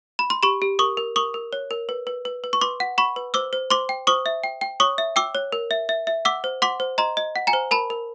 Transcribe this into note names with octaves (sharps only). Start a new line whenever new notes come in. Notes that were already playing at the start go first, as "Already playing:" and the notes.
B5
C6
G4 B5 C#6
G4
A#4 C#6 D#6
A#4
A#4 C#6 D#6
A#4
C#5
A#4
B4
B4
B4
B4
C#6
B4 C6 D6
F#5
F#5 B5 C#6
B4
C5 D6 E6
C5
C5 C6 D6
G5
C5 C#6 D#6
E5
G5
G5
C#5 C#6 D#6
E5
G5 D6 E6
C#5
A#4
E5
E5
E5
F#5 D6 E6
C5
F#5 C6 D6
C5
D#5 A#5 C6
D#5
F#5
G#5 A#5
C5
A#4 A5 B5
A#4